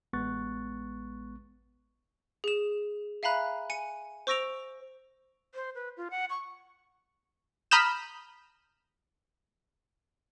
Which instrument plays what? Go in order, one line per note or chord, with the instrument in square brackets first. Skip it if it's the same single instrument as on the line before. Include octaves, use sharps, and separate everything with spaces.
[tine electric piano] A1 G#3 B3 C#6 F#6 A6
[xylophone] G#4 E7
E5 F5 G#5 A#5 B5 F#6
G#5 C#7 D#7
C5 C#6 E6 A#6 D7 F7
[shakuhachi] C5
B4
F4
F#5
C#6
[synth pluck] A#5 B5 D#6 F6 G6 E7